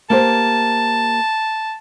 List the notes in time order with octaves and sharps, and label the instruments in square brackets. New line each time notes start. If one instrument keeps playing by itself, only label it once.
[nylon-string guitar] A#3 G4 C5 [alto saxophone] A5